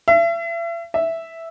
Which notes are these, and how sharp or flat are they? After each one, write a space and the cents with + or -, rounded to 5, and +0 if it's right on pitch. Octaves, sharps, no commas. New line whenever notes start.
E5 +40
E5 +0